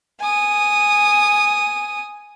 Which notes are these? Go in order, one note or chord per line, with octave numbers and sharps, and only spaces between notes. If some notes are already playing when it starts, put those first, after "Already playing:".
G#5 D#6